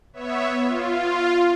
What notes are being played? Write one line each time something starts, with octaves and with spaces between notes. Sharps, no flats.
B3 C#5 E5
F4